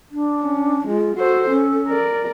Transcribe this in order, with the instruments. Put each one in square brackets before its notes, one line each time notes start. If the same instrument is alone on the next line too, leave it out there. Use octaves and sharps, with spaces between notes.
[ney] D4
[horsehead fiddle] C#4
[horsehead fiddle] G#3 [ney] F4
[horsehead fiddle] F#4 C5 [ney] A4
[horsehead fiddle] C#4
A#4 D5